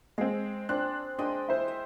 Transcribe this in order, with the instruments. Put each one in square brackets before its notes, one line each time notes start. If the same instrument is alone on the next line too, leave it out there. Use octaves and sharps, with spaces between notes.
[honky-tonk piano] G#3 C4 [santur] G#4
[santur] C4 [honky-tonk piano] D4 F#6
[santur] G#3 D#5 G5 [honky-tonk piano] D4
[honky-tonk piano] E4 C5
[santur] E5